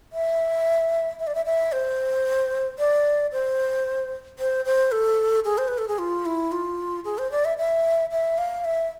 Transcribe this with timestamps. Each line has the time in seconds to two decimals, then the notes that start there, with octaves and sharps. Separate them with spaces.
0.13 E5
1.19 E5
1.27 D5
1.35 E5
1.46 E5
1.72 C5
2.79 D5
3.32 C5
4.39 C5
4.65 C5
4.92 A4
5.45 G#4
5.58 C5
5.68 B4
5.78 A4
5.88 G#4
5.99 F4
6.26 E4
6.52 F4
7.05 G#4
7.18 C5
7.32 D5
7.45 E5
7.58 E5
8.11 E5
8.38 F5
8.65 E5